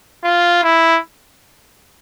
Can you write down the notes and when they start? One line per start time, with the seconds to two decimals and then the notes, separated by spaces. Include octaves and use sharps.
0.24 F4
0.63 E4